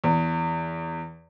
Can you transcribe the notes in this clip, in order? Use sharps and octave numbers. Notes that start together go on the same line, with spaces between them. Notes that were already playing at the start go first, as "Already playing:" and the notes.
E2